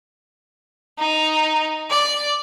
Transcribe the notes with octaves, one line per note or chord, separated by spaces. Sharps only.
D#4
D5